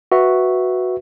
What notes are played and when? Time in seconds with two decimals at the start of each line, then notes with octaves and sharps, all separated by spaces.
0.12 F#4 B4 E5